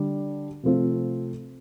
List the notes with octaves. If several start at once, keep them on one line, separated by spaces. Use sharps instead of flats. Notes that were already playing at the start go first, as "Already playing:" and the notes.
Already playing: D3 G3 D4
C3 F3 A3 C4 F4